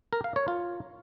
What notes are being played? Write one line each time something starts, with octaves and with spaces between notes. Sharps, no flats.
A#4
F5
C#5
F4